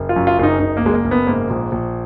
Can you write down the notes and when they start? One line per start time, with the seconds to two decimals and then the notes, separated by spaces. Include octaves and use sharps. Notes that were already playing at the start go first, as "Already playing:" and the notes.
Already playing: F#1
0.09 F4
0.16 F#2
0.27 F4
0.38 F#1 F4
0.43 D#4
0.60 F#1 D#4
0.77 A#3
0.82 F#1 G#3
0.94 A#3
1.04 F#1
1.11 B3
1.27 G#2 A#3
1.50 A#1
1.72 A#1